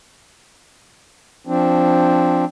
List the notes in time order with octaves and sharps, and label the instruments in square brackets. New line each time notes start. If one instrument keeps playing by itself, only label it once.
[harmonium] F3 C4 D4